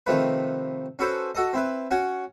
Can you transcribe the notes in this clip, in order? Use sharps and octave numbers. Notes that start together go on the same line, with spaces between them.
C3 D#3 F3 A3 B4
C#4 F#4 A4 B4 C5
F#4 A4 D#5
C4 E4 B4
C#4 F#4 C#5 F#5